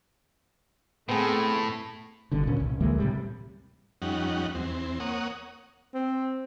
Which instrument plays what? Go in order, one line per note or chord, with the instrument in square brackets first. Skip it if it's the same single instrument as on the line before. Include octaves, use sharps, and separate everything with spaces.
[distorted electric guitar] A2 [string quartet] A3 [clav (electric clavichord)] B3 C4 G#4
[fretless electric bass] G1 G2 B2 D3
D2 A#2 C#4
C2
D2 E3 G#3 A#3
A2 C3 G3
[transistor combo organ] F2 G3 C#4 D#4 F#5
E2 C4
A#3 C#5 F#5 D#6
[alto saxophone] C4